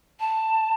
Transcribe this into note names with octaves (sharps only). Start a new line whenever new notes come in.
A5